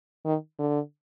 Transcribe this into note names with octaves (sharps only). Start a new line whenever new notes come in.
D#3
D3